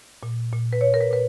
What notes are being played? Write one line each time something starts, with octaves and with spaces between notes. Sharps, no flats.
A#2
A#2
B4
A#2 C#5
A#4
B4
A#2 B4